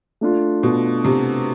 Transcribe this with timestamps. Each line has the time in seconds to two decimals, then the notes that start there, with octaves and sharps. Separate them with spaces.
0.21 A3 D4 F4
0.63 B2
1.04 C3